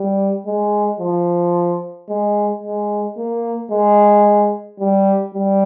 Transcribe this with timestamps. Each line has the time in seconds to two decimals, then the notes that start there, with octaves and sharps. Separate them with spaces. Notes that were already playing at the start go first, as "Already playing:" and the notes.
Already playing: G3
0.46 G#3
1.00 F3
2.09 G#3
2.63 G#3
3.17 A#3
3.71 G#3
4.80 G3
5.35 G3